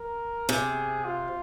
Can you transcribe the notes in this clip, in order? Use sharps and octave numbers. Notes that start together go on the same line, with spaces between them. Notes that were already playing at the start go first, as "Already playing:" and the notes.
Already playing: A#4
C3 G#4
F4